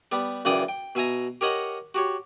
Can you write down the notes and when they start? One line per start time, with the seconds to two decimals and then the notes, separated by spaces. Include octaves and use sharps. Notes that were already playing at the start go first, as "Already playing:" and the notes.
0.12 G3 B3 G4
0.45 C#2 F#2 E3 D5 G5 D#6
0.69 G5
0.95 B2 E5 G#5 A#5
1.41 G4 A#4 C#5 D#5 F#5
1.94 F#4 G4 C#5